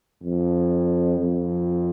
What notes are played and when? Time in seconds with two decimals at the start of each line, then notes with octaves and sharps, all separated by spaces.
0.22 F2
1.19 F2